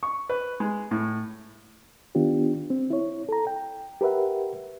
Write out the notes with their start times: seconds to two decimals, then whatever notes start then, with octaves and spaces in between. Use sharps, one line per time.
0.03 C#6
0.30 B4
0.60 G#3
0.91 A2
2.15 D#3 B3 D4 F4 G4
2.70 C4
2.90 E4 C#5
3.29 A4 A#5
3.47 G5
4.01 G4 A#4 B4 E5 F#5